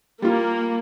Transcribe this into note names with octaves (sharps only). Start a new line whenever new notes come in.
G3 A#3 F4